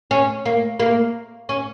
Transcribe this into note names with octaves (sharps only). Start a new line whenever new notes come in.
C#4
A#3
A#3
C#4